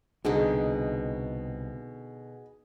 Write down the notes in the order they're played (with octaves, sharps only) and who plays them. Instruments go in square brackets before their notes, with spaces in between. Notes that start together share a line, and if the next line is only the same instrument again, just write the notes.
[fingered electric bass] C2 [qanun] B2 D3 D#4 [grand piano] G#4